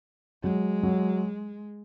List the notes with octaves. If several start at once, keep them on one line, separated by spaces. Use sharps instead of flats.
F#3 G#3
F#3